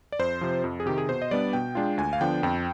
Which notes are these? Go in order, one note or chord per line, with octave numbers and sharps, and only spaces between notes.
D5
F2 C5
C3 F3
F2
G#4
C3 D#3 G4
G#4
B2 C5
D#5
G3 B3 D4 D5
B2 G5
G#3 D4 F4
D2 G#5
F5
D3 F3 B3 D4 G5
F2 G5